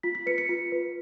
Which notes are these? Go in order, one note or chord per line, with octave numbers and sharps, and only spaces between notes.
F4 B6
B6
B4 C#7
C#7
F4
B4